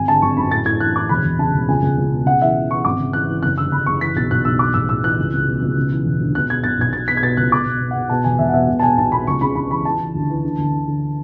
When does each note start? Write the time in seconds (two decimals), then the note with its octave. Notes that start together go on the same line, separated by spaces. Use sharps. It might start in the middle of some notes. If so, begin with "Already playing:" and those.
Already playing: G#1 G#5
0.08 D3 A5
0.22 G#1 C#6
0.37 F#2 B5
0.51 A2 A6
0.65 A2 G#6
0.80 E3 F#6
0.95 E3 D6
1.09 E1 B5
1.24 E1
1.39 C#3 A5
1.54 E1
1.68 C#2 G#5
1.82 C#2
1.98 C#2
2.12 B2
2.26 C#3 F#5
2.42 E3 E5
2.55 E3
2.70 E3 C#6
2.85 G#1 D6
3.00 C#3
3.13 E3 F#6
3.28 E3
3.43 F#1 F#6
3.58 D3 E6
3.72 F#1 B5
3.86 F#1 C#6
4.01 E3 B6
4.16 B1 A6
4.31 B1 F#6
4.45 B1 E6
4.59 E3 D6
4.74 A1 E6
4.89 A1 E6
5.03 E3 F#6
5.19 C#2
5.33 C#2
5.47 B2
5.62 C#2
5.77 C#3
5.91 E3
6.05 E1
6.20 D2
6.35 B2 F#6
6.50 B2 G#6
6.64 B1 A6
6.78 B1 G#6
6.93 B2 A6
7.08 B2 B6
7.17 G#6
7.22 B2 A6
7.37 C#2 F#6
7.51 B2 D6
7.66 B2
7.81 B2
7.91 B2 F#5
8.09 B2 A5
8.24 E1 G#5
8.39 E1 E5
8.49 F#5
8.53 B2 E5
8.68 B2
8.79 A5
8.82 B2 G#5
8.98 B1 A5
9.12 B2 B5
9.27 C#2 C#6
9.41 C#3 B5
9.55 C#3 B5
9.71 E3 B5
9.85 E3 A5
10.00 E3
10.15 D2
10.29 E3
10.44 D3
10.58 D2
10.73 D3
10.88 D3